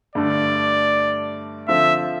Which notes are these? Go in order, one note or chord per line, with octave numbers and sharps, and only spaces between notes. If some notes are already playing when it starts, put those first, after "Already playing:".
G2 D3 A3 D5
D3 F3 C4 F4 A4 E5